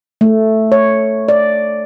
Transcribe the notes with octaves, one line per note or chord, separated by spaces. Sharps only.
A3
C#5
D5